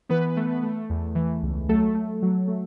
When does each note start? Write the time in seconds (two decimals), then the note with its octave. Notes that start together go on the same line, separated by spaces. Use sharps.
0.09 E3 B3 B4
0.37 A3
0.63 A3
0.90 E2
1.15 E3
1.43 C#2
1.69 F#3 A3 A4
1.95 A3
2.22 F#3
2.48 A3